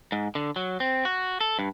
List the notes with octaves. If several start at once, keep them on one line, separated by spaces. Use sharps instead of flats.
G#2
D3
F#3
C4
F#4
A4
G2